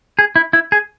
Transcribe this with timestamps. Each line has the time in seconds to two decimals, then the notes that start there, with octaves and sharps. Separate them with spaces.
0.19 G#4
0.36 E4
0.53 E4
0.72 G#4